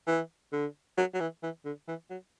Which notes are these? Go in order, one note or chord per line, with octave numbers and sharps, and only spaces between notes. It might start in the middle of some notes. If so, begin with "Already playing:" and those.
E3
D3
F#3
F#3
E3
E3
D3
E3
F#3